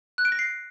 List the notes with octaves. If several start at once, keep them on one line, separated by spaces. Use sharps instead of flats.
F#6
D7
A#6
C7